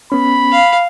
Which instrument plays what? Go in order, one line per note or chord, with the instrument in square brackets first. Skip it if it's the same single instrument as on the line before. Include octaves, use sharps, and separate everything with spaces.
[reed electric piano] B3 C#4 [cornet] B5
[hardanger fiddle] F5